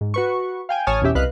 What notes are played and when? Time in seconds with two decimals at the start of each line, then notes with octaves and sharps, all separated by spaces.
0.01 G#2
0.14 F#4 B4 C#6
0.69 F5 G5 G#5
0.87 A1 C#5 G#5 A5 D#6 F6
1.02 E2 B2 C#4 G4 E5
1.15 C2 B4 D#5 F5 F#6